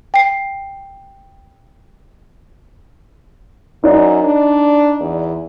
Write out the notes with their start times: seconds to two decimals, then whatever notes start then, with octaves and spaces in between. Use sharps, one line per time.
0.14 G5 C7
3.84 F#2 D#4 D5
4.23 D4
5.00 E2